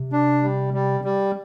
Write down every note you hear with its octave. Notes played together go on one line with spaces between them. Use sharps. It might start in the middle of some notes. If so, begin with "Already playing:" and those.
Already playing: C3
D4
G3
G3
G3